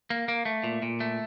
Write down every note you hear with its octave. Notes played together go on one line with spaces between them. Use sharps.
A#3
A#3
A3
A#2
A#2
A3